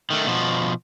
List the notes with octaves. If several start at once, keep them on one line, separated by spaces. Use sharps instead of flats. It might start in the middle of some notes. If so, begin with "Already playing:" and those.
D#3 A3
B2 F3